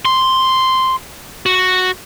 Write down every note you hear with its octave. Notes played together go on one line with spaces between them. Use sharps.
C6
F#4